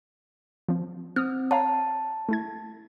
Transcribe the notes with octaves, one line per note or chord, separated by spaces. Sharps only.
F3 C4
C4 D#6 F6
C#5 F5 A5 A#5
A3 E4 G#6